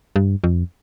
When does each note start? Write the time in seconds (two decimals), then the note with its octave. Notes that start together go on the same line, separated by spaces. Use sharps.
0.16 G2
0.44 F2